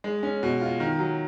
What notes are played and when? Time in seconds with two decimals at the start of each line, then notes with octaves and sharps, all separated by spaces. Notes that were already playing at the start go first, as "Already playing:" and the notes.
0.04 G#3
0.23 C#4
0.43 B2
0.61 F4
0.80 D#3
0.99 F#3